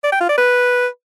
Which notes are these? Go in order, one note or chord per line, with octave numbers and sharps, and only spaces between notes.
D5
G5
F4
D5
B4